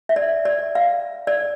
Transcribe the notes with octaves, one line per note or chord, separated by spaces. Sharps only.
E5
D5
D5
F5
D5